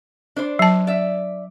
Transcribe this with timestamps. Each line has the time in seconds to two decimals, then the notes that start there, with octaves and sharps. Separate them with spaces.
0.36 D4 C5 D5
0.59 F#3 A5
0.87 D5 E5